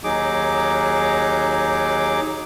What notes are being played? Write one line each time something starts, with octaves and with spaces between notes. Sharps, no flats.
D#2 F#3 D#4 G#4 D6